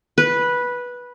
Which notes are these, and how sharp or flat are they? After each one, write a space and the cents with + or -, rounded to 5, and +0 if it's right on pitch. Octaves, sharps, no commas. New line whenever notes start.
B4 -10